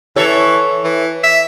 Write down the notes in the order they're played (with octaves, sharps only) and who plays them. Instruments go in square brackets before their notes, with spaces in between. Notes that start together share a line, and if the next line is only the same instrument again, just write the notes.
[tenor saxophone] E3 [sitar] A4 C#5
[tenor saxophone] E3
E5